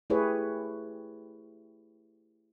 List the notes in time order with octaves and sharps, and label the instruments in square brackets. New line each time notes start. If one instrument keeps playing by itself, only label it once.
[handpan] A3 E4 G4 G#4 B4 C#5